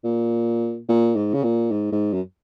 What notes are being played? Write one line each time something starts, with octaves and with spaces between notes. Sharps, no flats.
A#2
A#2
G#2
C#3
A#2
G#2
G#2
F#2